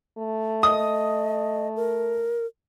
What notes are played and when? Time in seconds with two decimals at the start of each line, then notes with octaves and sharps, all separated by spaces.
0.18 A3
0.63 D#5 D#6
1.76 A#4